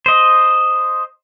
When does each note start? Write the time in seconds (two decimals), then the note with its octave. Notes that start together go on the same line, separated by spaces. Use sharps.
0.06 C5 D#5